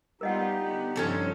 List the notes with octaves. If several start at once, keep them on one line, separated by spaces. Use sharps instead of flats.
G3 B3 D#4 F4 G4 A#4 D#5 F#5
D3 B3
G2 D#3 F3 C#4 A4 C#5